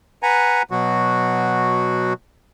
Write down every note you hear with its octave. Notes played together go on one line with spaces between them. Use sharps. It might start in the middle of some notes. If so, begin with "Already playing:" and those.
B4 F#5 G#5 A#5
B2 F#3 F#4